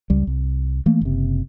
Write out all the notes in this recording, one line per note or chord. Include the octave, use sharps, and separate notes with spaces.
C#2 G3
C2
E3 A3 A#3
F#1 C3